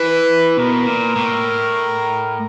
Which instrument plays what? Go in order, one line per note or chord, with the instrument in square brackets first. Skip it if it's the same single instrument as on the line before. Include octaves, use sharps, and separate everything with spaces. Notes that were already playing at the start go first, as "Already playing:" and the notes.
Already playing: [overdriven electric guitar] E3 [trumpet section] B4
[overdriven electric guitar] B2 [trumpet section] A#4
[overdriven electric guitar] A#2
A2